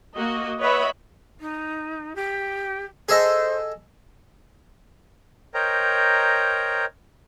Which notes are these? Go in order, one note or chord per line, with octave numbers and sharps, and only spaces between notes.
A#3 F#4 D#5
B4 C#5 D#5 E5 F#5 B5
D#4
G4
G#4 A4 C5 D#5
A#4 C5 C#5 D#5 G5 A#5